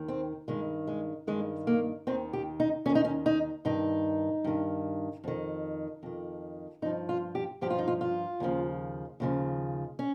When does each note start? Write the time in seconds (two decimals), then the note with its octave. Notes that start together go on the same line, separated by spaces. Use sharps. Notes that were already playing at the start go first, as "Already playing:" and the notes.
Already playing: D#2 D#3
0.08 C4
0.48 G2 D#3 G#3
0.87 G#3
1.27 G2 D#3 G#3
1.67 A#3
2.07 D#2 D#3 C4
2.33 G4
2.60 D#4
2.85 D#2 D#3 C#4
2.95 D#4
3.04 C#4
3.26 D#4
3.65 G2 D#3 D#4
4.44 G2 D#3
5.24 F2 D#3
6.03 F2 D#3
6.82 G2 D#4
6.85 F3
7.09 F4
7.35 G4
7.61 G2 F3 G4
7.70 F4
7.78 D#4
7.88 F4
8.01 F4
8.40 D#2 C#3 F3
9.20 D#2 C#3 F3
9.99 C#4